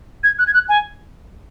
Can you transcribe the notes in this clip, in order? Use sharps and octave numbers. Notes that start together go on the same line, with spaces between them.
G#6
F#6
G#6
F#6
G#5